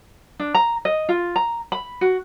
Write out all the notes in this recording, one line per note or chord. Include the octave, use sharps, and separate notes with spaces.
D4
A#5
D#5
F4
A#5
B5
F#4